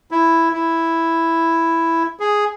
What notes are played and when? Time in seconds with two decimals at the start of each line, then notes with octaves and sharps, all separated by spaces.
0.11 E4
0.53 E4
2.20 G#4